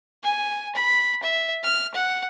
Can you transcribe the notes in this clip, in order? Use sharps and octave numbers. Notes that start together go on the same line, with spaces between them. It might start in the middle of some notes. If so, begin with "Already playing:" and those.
G#5
B5
E5
F6
F#5